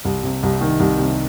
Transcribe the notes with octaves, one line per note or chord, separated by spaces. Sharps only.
C2
C3
C2
D#3
C2
C3